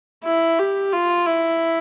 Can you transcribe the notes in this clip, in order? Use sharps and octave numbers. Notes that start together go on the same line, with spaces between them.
E4
G4
F4
E4